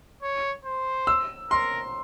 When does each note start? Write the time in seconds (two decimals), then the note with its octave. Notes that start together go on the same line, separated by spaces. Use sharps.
0.22 C#5
0.65 C5
1.07 E6
1.50 A#4 C6